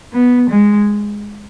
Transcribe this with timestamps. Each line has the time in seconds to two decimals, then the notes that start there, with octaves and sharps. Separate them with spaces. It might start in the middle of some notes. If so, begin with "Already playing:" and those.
0.13 B3
0.51 G#3